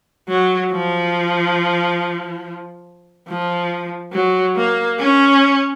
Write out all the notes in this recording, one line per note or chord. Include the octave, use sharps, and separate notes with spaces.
F#3
F3
F3
F#3
A#3
C#4